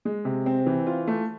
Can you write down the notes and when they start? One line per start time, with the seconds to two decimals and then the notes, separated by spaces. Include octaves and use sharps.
0.05 G#3
0.25 C3
0.46 C4
0.66 E3
0.86 F4
1.07 A3